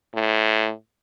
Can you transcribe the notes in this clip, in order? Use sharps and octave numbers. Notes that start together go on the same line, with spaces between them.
A2